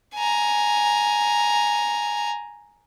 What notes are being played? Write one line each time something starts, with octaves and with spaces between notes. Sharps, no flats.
G#5 A#5